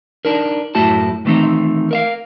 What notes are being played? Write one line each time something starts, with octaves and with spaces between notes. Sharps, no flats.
D4 D#4 A#4
F#2 A2 A3 E4 F#4 A5
D#3 E3 A3 C4 D#4
A#4 E5 F5